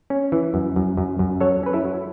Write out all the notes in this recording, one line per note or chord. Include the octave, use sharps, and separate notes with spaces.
C#4
E3
F#2
F#2
F#2
F#2
F#3 A4 C#5
C#4 B4
E4 A4
F#3